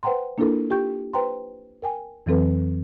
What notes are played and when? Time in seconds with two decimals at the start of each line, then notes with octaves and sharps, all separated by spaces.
0.03 B4 C5 F#5 G5 A#5 C6
0.38 A#3 D4 E4 F4 A4 A#4
0.70 F4 G4 G5 C#6 G6
1.13 B4 C5 G5 A#5 C6
1.82 A#4 G5 G#5
2.26 F2 E3 F#3 C4 A4 B4